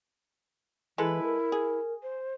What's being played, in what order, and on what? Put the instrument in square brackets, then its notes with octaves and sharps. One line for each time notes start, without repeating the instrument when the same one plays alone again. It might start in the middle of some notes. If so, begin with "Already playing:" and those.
[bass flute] E3 [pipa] G#3 A4 B4 [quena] E4
[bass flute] A#4
[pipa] G#4
[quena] C5